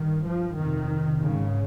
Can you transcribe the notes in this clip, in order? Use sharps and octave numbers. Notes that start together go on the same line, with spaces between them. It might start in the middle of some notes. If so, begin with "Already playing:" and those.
Already playing: G2 D#3
F3
F2 C3 D#3
G#2 C#3